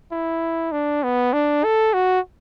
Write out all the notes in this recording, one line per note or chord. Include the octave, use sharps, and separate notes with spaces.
E4
D4
B3
D4
A4
F#4